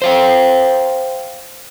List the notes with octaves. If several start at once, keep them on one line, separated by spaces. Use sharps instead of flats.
C5 F5 G5